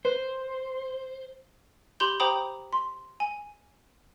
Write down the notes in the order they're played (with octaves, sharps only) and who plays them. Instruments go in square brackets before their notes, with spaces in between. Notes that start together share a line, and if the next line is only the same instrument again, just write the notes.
[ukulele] B4 [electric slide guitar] C5
[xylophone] G4 B5 C6 G6 G7
G4 C5 G5 A#5 B5 D#6
C6
G#5